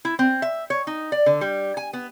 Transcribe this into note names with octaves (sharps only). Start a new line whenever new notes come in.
E4
C4
E5
C#5
D#4
D5
D3
G3
G#5
B3